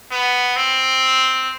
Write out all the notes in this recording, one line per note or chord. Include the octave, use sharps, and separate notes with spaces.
B3
C4